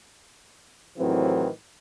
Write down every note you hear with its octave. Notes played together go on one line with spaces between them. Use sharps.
A2 C3 D#3 E3 F#3 C4